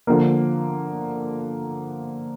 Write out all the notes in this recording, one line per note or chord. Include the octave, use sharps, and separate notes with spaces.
D3 F3 A#3